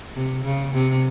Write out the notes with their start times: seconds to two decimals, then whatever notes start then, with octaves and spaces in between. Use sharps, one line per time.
0.15 C3
0.44 C#3
0.74 C3